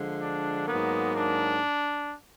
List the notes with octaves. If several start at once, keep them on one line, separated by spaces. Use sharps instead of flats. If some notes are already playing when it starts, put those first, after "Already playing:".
Already playing: D3 F3 G#3
D4
G#2 F#3 A#3 B3
D4